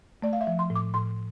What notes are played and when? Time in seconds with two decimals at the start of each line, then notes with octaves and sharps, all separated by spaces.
0.22 A3 D5
0.33 F5
0.41 E5
0.47 F3
0.59 C6
0.70 A2
0.76 D6
0.94 A2 C6